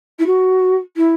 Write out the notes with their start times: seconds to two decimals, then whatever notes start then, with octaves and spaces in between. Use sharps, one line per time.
0.19 E4
0.26 F#4
0.96 E4